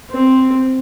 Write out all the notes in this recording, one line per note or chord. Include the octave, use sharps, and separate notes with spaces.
C4